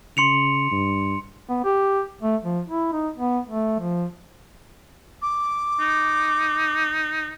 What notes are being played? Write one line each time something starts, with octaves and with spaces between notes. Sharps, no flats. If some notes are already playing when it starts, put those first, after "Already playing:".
C#3 C6 C#7 F7
G2
B3
G4
A3
F3
E4
D#4
B3
A3
F3
D6
D#4